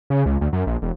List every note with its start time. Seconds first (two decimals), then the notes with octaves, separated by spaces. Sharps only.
0.10 C#3
0.26 C#2
0.41 D2
0.53 F#2
0.67 A#1
0.82 E1